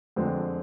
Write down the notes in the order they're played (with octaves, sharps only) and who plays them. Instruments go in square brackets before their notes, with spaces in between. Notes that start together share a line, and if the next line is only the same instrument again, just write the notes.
[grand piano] F2 D3 G#3 C4